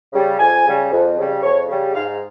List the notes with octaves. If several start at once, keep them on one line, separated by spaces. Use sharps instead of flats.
C#3 G3
F2 G#5
C#3 G3
F2
C#3 G3
F2 C#5
C#3 G3
G#2 F5